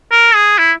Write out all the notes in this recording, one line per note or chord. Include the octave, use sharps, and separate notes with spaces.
A#4
G#4
E4